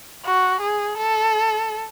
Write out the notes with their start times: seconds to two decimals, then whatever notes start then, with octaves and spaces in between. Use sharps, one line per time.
0.25 F#4
0.61 G#4
0.98 A4